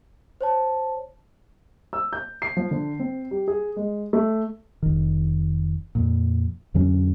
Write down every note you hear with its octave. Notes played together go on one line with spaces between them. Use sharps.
C5 C#5 A5
E6
G6
C7
F3
D3
C4
G3
G#4
G#3
A3
F1 D#3
F2 A#2
F2 D3 F#3 C#4